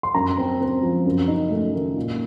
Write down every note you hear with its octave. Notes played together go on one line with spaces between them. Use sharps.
C6
F#2 A#5
C4
C4
F3
F#2
D#4
A3
D#3
A#2